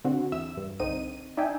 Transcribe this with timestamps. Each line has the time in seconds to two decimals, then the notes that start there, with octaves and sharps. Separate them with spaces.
0.05 D3 C4 F#4
0.32 E2 E5 E6
0.57 G2
0.80 C2 D3 C4 D#4 D#7
1.37 D4 D#4 E5 G5 G#5